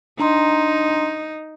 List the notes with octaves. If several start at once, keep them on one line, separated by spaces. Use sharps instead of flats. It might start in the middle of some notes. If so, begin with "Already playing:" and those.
D4 D#4 A#5 C6